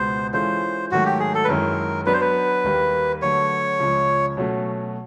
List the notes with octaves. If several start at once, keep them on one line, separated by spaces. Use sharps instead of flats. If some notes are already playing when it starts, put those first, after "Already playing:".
Already playing: C#2 B2 G#3 B3 C5
E3 G#3 C#4 F4 A4 C5
G#2 D#3 F#3 A3 F#4
G4
G#4
A4
B4
F#2 D#3 G#3 C#4 E4 A#4
F#3 B3 D4 F#4 B4
C5
B4
D#2 D#3 G3 A#3
D3 F#3 A3 C#5
C#2 C#3 F3
B2 F#3 A3 C#4